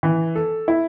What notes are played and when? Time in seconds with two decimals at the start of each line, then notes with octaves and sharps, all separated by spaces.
0.03 E3
0.36 A4
0.68 E4